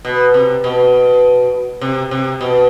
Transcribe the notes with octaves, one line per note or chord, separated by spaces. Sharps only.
B2
C3
B2
C3
C3
B2